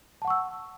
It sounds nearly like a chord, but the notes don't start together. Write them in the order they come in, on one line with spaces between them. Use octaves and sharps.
A5 F#5 C#6 E6